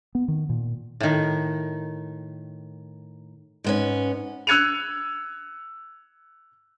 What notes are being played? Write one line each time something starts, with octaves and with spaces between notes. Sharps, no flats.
B3
D#3
A#2
A2 D#3
G#2 B3 C#4
E6 F#6 G#6 C#7 D#7 F7